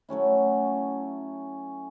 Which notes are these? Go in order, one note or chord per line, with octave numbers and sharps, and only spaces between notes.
F#3 A3 C#4 E4